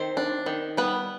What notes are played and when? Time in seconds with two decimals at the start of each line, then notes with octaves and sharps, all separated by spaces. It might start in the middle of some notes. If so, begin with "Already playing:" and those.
Already playing: D#3 C4 C5
0.17 D4
0.46 D#3
0.77 G3 B3 B4